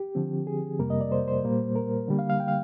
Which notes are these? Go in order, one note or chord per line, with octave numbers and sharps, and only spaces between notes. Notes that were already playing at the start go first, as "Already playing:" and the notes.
Already playing: G4
D3 F3 C4
G#4
F2 C3 G3 A#3 A#4
D#5
D5
C5
C5
A#2 G3 A#3
A#4
D3 G3 A#3
F5
F5
G5
F5